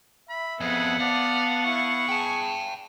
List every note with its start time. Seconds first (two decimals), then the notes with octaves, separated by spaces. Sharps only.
0.29 E5 B5
0.60 F2 B3 G#4 F#5
1.00 D5 F5 A5
1.65 E4 C#6
2.09 G#4 G5 A5